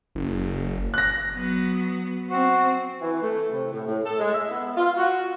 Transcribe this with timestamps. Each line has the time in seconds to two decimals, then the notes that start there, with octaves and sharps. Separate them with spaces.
0.15 F#1
0.94 F#6 A#6
1.34 F#3 B3
2.30 C4 F#4
3.00 E3
3.23 A3
3.51 C3
3.72 A2
3.86 A2
4.04 A4
4.19 G#3
4.33 E5
4.49 B3
4.75 F4
4.97 F#4